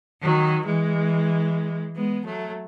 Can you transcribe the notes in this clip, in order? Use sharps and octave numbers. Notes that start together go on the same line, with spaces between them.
D#3 F#3
E3 G#3
G#3 B3
F#3 A3